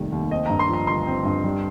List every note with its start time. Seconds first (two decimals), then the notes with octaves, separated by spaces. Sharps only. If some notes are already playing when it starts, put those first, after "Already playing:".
Already playing: F1 D#2 D#3 G3
0.12 D#2
0.31 C4 D#5
0.46 G2 A#5
0.59 C6
0.69 F3 A#5
0.87 G1 C6
1.07 C4
1.25 G2
1.44 G3